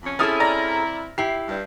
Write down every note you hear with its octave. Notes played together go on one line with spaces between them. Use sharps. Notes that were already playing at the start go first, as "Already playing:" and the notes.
F2 C#4
C4 C#4 E4 G#4 A4 D#6 F6 A6
D5 A#5 A#6
E4 G4 C7
G2